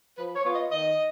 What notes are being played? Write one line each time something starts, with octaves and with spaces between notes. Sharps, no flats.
F3 B4
C#5
B3 F4
D#5
D#3 D#5